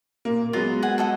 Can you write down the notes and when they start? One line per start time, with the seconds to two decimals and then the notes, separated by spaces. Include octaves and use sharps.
0.25 A#2 A#3
0.53 F#3 G#3 B3 F4
0.83 F#5 G#5
0.98 A4 D#5 F#5